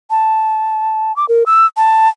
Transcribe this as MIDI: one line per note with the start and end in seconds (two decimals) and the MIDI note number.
0.10 1.15 81
1.16 1.25 86
1.29 1.44 70
1.46 1.66 88
1.77 2.09 81